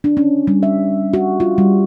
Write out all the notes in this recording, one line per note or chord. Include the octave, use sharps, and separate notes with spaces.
D4
C#4
G3
E5
F#4
F4
G3